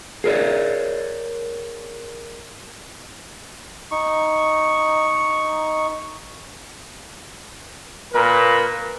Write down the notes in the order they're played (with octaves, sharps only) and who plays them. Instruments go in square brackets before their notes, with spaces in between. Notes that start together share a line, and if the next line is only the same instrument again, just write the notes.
[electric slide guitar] G#4 A#4 C#5 D5
[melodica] D#4 C#6
[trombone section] A#2 A#4 B4